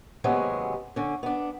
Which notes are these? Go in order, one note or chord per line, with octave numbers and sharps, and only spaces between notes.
D#2 C3 F#3 G#3 B3 C#4
D3 C#4
B3 D4